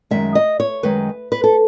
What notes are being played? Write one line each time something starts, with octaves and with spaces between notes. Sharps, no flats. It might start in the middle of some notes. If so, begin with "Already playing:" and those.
F#2 D#3 G#3 E5
D#5
C#5
F#2 D#3 G#3 B4
B4
A4